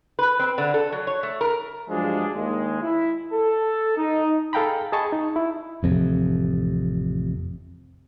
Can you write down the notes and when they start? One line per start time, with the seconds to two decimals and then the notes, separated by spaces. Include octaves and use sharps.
0.19 B4
0.39 C4
0.58 D3
0.74 A4
0.92 F#3
1.07 C#5
1.23 A3
1.41 A#4
1.89 G2 F3 F#3 G#3 D4
2.34 D#2 G#3
2.82 E4
3.32 A4
3.97 D#4
4.53 G#4 A4 F5 G5 A#5 B5
4.93 G#4 D#5 A5 B5 C#6
5.12 D#4
5.36 E4
5.83 A1 F2 C3